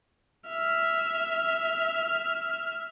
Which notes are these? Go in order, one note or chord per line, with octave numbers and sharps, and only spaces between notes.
E5 F6